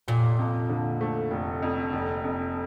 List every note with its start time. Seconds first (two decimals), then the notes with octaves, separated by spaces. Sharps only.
0.08 F1 A#2
0.39 F2
0.69 D3
1.01 A3
1.31 F1
1.63 F2
1.93 F1
2.24 F2